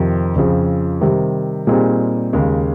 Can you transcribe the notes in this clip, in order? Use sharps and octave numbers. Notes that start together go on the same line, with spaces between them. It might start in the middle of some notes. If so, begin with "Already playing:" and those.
Already playing: F2 C3 D#3
F2 C#3 F3
C3 D#3 G3
A#2 G3 C4 D#4 G#4
D#2 C#3 G#3